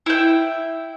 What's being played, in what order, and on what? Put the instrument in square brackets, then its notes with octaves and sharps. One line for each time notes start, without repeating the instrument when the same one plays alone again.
[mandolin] E4 G5